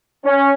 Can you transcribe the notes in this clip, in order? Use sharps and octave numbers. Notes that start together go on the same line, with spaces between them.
C#4